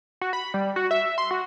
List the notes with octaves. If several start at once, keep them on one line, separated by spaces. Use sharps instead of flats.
F#4
B5
G3
F#4
E5
C6
F#4